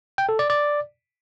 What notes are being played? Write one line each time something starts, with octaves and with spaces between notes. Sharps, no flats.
G5
A4
D5
D5